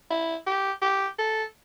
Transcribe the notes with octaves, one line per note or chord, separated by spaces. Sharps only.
E4
G4
G4
A4